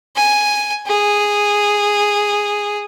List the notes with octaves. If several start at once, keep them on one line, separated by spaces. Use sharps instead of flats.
G#5
G#4